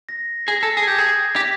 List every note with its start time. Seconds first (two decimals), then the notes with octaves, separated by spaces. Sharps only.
0.09 A#6
0.48 G#4 A#6
0.63 A4
0.77 G#4
0.83 G#6
0.87 G4 G6
0.97 G#4 G#6
1.36 G4 B6